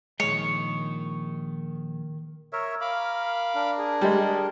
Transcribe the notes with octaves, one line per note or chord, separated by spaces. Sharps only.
A#1 D#3 G#3 C#5 D#5
A#4 C#5 E5
A#4 F5 B5 D6
D4 A#4
G#4
G3 G#3